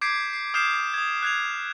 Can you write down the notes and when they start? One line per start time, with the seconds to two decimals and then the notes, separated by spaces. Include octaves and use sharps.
0.01 D6 G6 G#6 B6 C7 D7
0.33 C7
0.54 D#6 F6 G6 G#6 C7 E7
0.94 D#6 G#6
1.22 F#6 G#6 F7